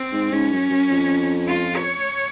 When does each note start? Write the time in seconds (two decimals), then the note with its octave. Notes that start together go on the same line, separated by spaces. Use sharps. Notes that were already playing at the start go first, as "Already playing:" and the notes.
Already playing: C4
0.12 G#2
0.32 G#2 C#4
0.52 F#2
0.70 F#2
0.90 F2
1.48 F4
1.77 C#5